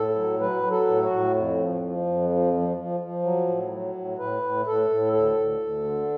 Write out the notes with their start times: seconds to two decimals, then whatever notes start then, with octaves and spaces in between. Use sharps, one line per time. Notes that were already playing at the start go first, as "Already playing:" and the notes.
Already playing: A2 A4
0.16 F#3
0.40 F#3 B4
0.63 F#3
0.71 A4
0.87 A2
1.03 F#4
1.10 A2
1.35 F2
1.58 F3
1.82 F3
2.06 F2
2.29 F3
2.53 F3
2.77 F3
3.00 F3
3.23 F#3
3.48 A2
3.71 F#3
3.95 A2
4.18 A2 B4
4.42 A2
4.66 A2 A4
4.90 A2
5.12 D2 A4
5.36 D2
5.60 D2
5.84 D3